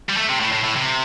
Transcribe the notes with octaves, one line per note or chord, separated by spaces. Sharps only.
G3
A3
C3
A2
A2
A2
C3